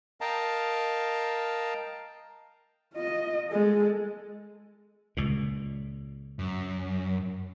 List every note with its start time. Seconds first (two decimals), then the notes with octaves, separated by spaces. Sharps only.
0.21 A#4 D#5 F5 G5 A5 A#5
2.94 F4 D#5
3.49 G#3 A4
5.17 C#2 A#2
6.39 F#2